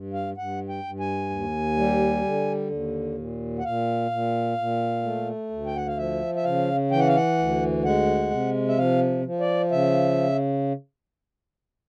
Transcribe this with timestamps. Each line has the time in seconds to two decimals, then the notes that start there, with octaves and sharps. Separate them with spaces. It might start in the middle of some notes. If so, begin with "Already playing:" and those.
Already playing: G2
0.14 F5
0.37 G2 F#5
0.69 G5
0.84 G2
1.00 G#5
1.30 D#2
1.77 G3
2.24 D3
2.70 D#2
3.18 A#2
3.59 F#5
3.64 A#2 F5
4.11 A#2
4.58 A#2
5.03 A3
5.50 D2
5.66 G5
5.76 F#5
5.87 F5
5.98 F3 E5
6.36 E5
6.44 C#3 F5
6.91 E3 G5
7.00 F#5
7.08 F5
7.16 F#5
7.38 D2
7.84 G#3 F#5
8.31 C3
8.68 E5
8.77 F3 F5
9.25 F3
9.40 D5
9.71 C#3 E5